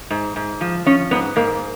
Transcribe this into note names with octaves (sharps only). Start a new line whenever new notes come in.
G#2
G#2
F3
F3 C#4
G#2 B3
G#2 A#3